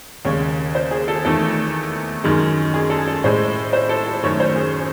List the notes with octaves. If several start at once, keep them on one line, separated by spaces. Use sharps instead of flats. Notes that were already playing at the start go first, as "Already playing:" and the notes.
D#2 C#3 G#3 C#5
C5
G#4
A4
E2 D#3 A3 A4
F#2 D#3 G#3
G#4
A4
A4
A2 G#3 C5
C5
A4
A4
F#2 D#3 A3 C#5
C5
G#4